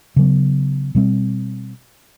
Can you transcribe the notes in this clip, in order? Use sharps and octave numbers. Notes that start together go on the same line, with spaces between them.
C#3 F#3 B3
B2 G3 C4